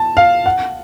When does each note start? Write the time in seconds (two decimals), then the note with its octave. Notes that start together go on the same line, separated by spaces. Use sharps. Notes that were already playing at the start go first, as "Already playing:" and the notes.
Already playing: A5
0.17 F5
0.46 F#5